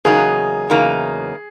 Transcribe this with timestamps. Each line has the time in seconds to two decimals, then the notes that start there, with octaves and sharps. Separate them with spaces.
0.05 E2 C#3 F#3 A#3 D#4 G#4
0.70 E2 C#3 F#3 A#3 D#4